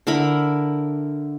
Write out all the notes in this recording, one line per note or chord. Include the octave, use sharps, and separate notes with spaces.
D3 E4 A#4 B5